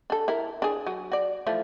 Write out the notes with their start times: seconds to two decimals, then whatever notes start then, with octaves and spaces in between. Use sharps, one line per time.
0.10 D4 A4
0.28 E4 A#4
0.62 D4 G#4
0.87 F#3
1.12 F#4 D5
1.47 E3 F3 A3